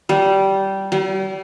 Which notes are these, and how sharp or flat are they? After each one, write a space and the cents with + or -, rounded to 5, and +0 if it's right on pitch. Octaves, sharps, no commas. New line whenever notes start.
G3 -15
G3 -40